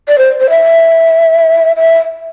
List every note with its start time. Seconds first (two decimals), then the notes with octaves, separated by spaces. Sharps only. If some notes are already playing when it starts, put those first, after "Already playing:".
0.08 D5
0.18 C5
0.40 C5
0.50 E5
1.76 E5